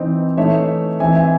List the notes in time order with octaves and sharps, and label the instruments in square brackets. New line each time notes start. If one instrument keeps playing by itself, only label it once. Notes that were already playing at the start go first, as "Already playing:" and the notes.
Already playing: [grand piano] E3 C4 D#4
E3 A3 D#4 C#5 E5
E3 C4 D#4 E5 G#5
E5 G#5